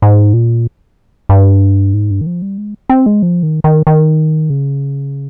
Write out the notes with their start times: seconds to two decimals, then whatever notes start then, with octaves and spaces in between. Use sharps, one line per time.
0.02 G#2
0.33 A#2
1.29 G2
1.94 G#2
2.11 G2
2.21 D#3
2.26 F3
2.42 G3
2.58 G#3
2.89 C4
3.06 G#3
3.22 F3
3.43 D#3
3.64 D#3
3.87 D#3
4.50 C#3